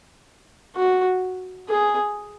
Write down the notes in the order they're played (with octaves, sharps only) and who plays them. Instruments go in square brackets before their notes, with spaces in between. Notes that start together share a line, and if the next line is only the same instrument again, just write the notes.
[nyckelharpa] F#4
G#4